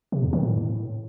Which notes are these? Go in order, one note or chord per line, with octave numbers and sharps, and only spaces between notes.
C3
E2
D#3
A2